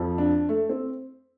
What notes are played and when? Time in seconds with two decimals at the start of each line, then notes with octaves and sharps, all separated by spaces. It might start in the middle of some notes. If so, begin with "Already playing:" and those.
Already playing: F2 F3
0.18 D4
0.49 A3
0.69 C4